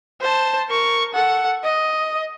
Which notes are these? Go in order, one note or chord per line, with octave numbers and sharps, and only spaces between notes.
C5 A5
A#4 C#6
A4 F#5
D#5